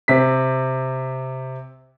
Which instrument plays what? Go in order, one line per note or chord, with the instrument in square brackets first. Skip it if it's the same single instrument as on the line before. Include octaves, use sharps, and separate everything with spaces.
[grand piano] C3 C4 B6